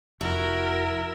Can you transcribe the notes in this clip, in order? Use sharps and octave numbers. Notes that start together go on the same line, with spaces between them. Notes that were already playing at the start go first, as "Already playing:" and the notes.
F1 E4 F#4 A#4